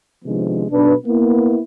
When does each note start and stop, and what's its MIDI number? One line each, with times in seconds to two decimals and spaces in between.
0.25 0.64 48
0.25 0.64 51
0.25 0.64 53
0.25 0.64 56
0.25 0.64 59
0.25 0.64 62
0.70 0.93 35
0.70 0.93 62
0.70 0.93 71
1.05 1.59 58
1.05 1.59 59
1.05 1.59 64